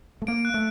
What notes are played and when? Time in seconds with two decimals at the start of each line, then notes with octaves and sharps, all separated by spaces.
0.22 A3
0.27 A#3 D7
0.45 F#6
0.54 A3